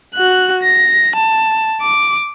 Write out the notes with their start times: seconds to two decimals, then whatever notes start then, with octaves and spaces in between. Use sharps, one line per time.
0.14 F#4 F#6
0.63 A#6
1.15 A5
1.81 D6